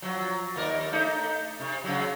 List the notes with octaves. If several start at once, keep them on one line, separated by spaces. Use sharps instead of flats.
F3 F#3
D#2 A#4 D5
A3 D#4
C3
C#3 F#3